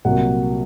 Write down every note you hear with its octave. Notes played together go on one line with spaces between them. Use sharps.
C2 A#2 F#3 A#3 F#5